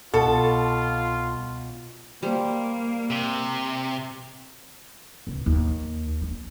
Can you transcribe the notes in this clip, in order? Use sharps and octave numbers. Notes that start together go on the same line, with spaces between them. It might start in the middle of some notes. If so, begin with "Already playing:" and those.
C2 B2 F4 A4
G3 A#3 C5
C3
C#2
D#2
D4